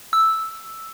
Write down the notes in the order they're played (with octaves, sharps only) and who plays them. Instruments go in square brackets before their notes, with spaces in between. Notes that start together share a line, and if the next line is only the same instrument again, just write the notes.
[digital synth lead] E6